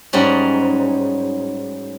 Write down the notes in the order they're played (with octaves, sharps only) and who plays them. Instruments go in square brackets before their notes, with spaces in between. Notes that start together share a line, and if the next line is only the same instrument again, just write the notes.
[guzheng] G#2 F#3 G3 C#4 D#4